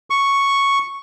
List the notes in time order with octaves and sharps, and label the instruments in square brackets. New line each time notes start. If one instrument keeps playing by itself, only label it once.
[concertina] C#6